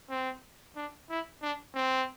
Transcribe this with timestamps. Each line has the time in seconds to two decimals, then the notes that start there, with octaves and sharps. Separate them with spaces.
0.11 C4
0.77 D4
1.10 E4
1.42 D4
1.75 C4